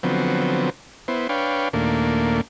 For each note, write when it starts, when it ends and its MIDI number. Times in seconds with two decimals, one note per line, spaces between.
0.03 0.70 50
0.03 0.70 53
0.03 0.70 54
0.03 0.70 59
0.03 0.70 60
1.08 1.27 59
1.08 1.27 64
1.08 1.27 72
1.29 1.68 62
1.29 1.68 71
1.29 1.68 73
1.29 1.68 77
1.29 1.68 79
1.73 2.41 39
1.73 2.41 46
1.73 2.41 57
1.73 2.41 58
1.73 2.41 62